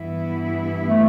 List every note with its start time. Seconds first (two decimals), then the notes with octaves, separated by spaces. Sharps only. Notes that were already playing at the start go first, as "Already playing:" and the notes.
Already playing: G2 E3 B3 E4
0.87 A3